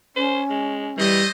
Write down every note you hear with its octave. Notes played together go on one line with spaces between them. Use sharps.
C#4 C5
G#3
E3 G3 A3 C5 D#5